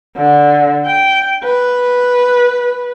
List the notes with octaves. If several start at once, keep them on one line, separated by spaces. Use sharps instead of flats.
D3
G5
B4